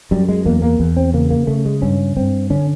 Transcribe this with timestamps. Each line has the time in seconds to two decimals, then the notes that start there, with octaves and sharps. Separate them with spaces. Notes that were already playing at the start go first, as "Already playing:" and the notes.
0.11 F#2 G3
0.29 G#3
0.45 E2 A#3
0.62 A#3
0.80 E2
0.97 C4
1.13 C#3 A#3
1.30 A#3
1.47 C#3 A3
1.66 G#3
1.82 G2 C#4
2.16 G2 C4
2.50 D3 C#4